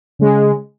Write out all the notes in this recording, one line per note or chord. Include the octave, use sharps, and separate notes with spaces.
C#3 G#3